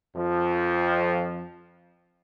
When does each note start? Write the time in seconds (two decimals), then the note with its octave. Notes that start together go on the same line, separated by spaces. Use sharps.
0.16 F2 F3